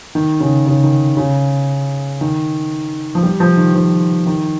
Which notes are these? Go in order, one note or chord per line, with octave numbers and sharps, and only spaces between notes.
D#3
C#3
C#3
D#3
C#3
D#3
F3
G3
F3
D#3
F3
D#3